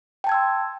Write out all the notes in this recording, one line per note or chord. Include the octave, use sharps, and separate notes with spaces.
G5 A5 C6 E6 G#6